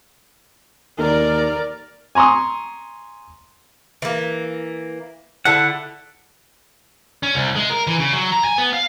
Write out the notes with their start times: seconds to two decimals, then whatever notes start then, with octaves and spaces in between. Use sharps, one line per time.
0.98 D#2 A#4 D5
2.15 G#5 A#5 C6 C#6 D#6
4.02 E3 A#3
5.45 D3 E4 F#5 A5
7.23 C#4
7.35 C2
7.56 G#3
7.70 A#4
7.87 E3
8.00 C#3
8.13 F#3
8.32 A#5
8.44 G#5
8.58 B3
8.74 F5